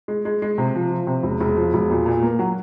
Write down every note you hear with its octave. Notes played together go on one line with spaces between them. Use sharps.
G#3
G#3
G#3
C3
F3
F3
C3
E1
E1
F3
E1
A#2
A#2
A#3
F#3